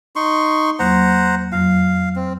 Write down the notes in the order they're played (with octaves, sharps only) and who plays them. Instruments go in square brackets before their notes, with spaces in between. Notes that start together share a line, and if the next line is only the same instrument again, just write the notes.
[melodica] D#4 C6 C#6
[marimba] E2 F#3 A#3 [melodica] C5 F#5 A#5
[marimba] F2 F#3 [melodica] F5
[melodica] C4